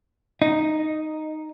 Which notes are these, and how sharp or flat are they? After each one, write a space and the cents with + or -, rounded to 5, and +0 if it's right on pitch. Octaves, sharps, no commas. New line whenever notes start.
D#4 -5